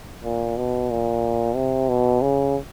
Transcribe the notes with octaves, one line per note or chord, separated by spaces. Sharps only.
A#2
B2
A#2
C3
B2
C#3